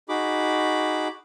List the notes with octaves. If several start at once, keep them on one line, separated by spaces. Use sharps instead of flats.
D#4 F#4 G#4 B5 D6